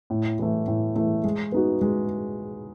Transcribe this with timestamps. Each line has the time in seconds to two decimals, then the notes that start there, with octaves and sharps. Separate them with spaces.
0.10 A2
0.39 E3 A3
0.68 A2
0.96 E3 A3
1.24 G#3
1.52 B3 D#4 F#4
1.81 G#3